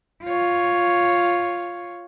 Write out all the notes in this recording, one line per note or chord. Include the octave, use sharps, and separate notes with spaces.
F4 C#5